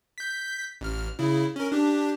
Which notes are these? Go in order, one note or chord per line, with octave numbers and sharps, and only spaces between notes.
G6 B6
A1 F6
C#3 E4
C#4 A#4
D4 G4